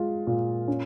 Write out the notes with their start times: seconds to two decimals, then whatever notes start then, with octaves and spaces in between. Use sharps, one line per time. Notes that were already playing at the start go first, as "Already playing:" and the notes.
Already playing: G#3 F4
0.27 A#2
0.68 C#4